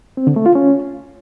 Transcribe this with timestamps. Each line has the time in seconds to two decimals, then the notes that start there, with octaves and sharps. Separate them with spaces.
0.17 C4
0.27 D3
0.36 A3
0.46 F4
0.55 C#4